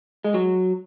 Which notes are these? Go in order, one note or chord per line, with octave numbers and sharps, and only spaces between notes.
G#3
F#3